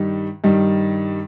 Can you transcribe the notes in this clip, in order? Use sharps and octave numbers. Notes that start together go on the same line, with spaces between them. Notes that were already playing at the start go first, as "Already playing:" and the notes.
Already playing: G2 D#3 G3
G2 D#3 G3